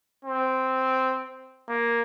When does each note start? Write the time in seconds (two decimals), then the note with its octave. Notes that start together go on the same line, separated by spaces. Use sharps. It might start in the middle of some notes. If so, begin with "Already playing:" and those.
0.25 C4
1.68 A#3